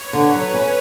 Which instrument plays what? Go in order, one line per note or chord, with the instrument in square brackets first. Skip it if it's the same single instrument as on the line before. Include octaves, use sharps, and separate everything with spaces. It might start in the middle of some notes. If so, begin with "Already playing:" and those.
Already playing: [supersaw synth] B4 C#5
[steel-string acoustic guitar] D3
F#3
C#4